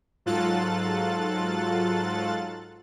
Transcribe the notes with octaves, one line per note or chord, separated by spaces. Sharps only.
G#2 F#3 F4 A4 F#6 A6